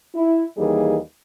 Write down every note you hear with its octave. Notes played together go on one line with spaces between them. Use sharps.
E4
D#2 E3 G3 A#3 D#4 G#4